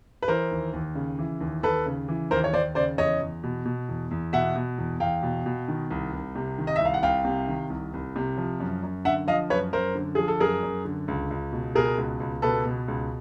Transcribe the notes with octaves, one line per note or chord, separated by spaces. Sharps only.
B4
E3 A#4 C5
D#2
D#2
C#3
E3
D#2
D#2 A4 B4
C#3
E3
D#2 A#4 C5
C#5
D#2 C5 D5
C#3 C5 D5
E2 C#5 D#5
E2
B2
B2
E2
E2
B2 E5 F#5
B2
E2
E2 F5 G5
B2
B2
D#3
C2
C2
C3
D#3
D#5
E5
C2 F5
F#5
C2 F5 G5
C3
D#3
C2
C2
C3
F3
F#2
F#2
D3 E5 F#5
F3 D#5 F5
F#2 B4 C#5
F#2 A#4 C5
D3
F3 G#4
A4
F#2 G#4 A#4
F#2
D3
C#2
C#2
B2
B2 G#4 A#4
C#2
C#2
B2 A4 B4
B2
C#2